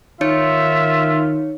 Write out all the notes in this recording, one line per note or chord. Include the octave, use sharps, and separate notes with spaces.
D#3 D#4 F4 C#5 E5 C#7